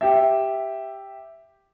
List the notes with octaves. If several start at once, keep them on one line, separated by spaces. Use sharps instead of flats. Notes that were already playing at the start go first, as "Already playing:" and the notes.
G4 E5